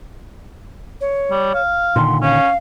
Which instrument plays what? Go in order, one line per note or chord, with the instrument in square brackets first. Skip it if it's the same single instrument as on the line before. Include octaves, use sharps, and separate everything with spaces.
[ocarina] C#5
[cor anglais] G3
F5
[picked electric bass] A#2 D3 D#3 [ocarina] C6
[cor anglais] C#4 [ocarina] F5